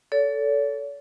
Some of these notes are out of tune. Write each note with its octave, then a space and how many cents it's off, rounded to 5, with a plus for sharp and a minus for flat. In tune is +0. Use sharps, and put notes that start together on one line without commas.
A4 +0 C#5 +45